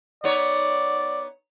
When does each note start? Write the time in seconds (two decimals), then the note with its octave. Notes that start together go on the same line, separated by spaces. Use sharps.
0.24 B3 D#4 C#5 D5